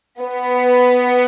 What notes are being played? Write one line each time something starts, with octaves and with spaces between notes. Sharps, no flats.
B3